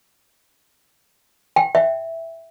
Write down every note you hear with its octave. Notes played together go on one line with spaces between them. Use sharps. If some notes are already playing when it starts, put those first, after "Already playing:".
G5
E5